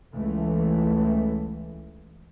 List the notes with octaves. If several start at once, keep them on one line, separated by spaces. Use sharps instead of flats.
C#2 E3 A3